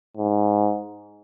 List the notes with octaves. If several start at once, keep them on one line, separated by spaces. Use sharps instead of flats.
G#2